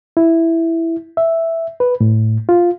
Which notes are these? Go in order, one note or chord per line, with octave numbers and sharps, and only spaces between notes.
E4
E5
B4
A2
F4